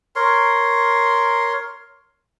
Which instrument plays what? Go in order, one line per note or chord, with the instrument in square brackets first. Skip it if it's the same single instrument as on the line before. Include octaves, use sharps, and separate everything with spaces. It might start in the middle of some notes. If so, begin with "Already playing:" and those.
[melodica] A#4 C#5 C6